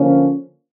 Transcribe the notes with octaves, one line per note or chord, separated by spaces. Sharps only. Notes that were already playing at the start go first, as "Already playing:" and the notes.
Already playing: D3 F3 A#3 C#4